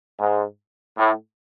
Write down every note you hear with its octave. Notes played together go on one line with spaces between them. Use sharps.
G#2
A2